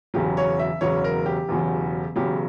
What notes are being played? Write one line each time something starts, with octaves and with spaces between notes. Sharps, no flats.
E1 E2 C#3 F#3 G4
C#5
E5
E1 E2 C#3 F#3 C#5
A#4
G4
E1 E2 C#3 F#3
E1 E2 C#3 F#3 G4